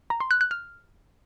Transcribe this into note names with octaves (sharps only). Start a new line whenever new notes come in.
A#5
C6
F#6
F#6
F6